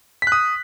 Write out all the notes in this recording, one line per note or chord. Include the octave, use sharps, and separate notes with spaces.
D#6 F#6 B6